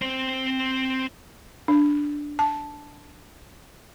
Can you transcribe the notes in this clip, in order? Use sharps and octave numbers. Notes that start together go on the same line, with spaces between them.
C4 C5
D4
A5